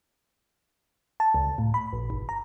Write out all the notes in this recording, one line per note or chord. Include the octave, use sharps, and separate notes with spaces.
A5
C#2
A2
B5
A#1
G1
A#5